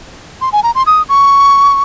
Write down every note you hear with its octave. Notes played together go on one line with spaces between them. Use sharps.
C6
G#5
A#5
C6
D#6
C#6